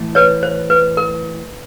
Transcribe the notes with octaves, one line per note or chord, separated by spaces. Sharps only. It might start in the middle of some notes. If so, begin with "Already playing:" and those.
Already playing: A2 E3 A3
B4 C#5
C5
B4
A#4